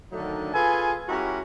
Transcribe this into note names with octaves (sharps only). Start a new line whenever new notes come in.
D3 D#3 F#3 A3 D4 D#4
F4 G#4 A4 B4 G#5
G#3 C#4 E4 F#4 G4 A#4